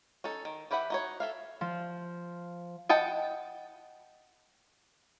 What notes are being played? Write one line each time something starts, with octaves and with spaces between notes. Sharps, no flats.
C#4 D#4 A4
D#3
E3 G4 B4 E5 F#5
D#4 F#4 C#5
A4 E5 F5
F3
D#5 F#5 G5 A5